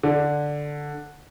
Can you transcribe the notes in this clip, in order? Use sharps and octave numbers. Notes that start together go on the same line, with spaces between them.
D3